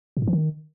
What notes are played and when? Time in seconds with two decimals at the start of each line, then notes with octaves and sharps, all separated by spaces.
0.17 B2
0.22 G#2
0.28 E3
0.33 D#3